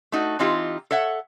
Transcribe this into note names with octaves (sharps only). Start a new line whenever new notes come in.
A3 D#4 F#4
E3 C4 D#4 F4 G4
A4 C#5 E5 F#5